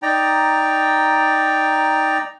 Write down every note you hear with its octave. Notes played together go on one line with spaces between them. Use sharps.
D#4 D5 G5 A#5